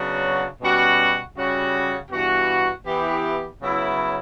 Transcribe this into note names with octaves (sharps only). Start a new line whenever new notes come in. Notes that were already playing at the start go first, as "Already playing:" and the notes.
Already playing: C#3 F#3 B3 D4 F#4
B2 G3 C#4 F#4
C#3 G3 C#4 F#4
G2 E3 B3 F#4
E3 B3 E4 G4
C#3 F#3 B3 E4